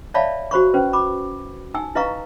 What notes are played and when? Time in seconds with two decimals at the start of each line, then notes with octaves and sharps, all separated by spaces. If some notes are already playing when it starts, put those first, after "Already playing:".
0.14 C#5 D5 E5 F5 A5 B5
0.51 F#4 C5 B5 C#6
0.74 C#4 B4 C5
0.93 B5 D6
1.74 D#4 G#5 E6
1.95 E4 B4 D#5 F5 A#5 C#6